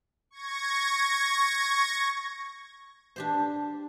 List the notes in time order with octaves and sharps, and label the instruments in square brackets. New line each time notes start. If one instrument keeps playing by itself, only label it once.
[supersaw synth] C#6 G#6 A#6
[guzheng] D4 G4 C5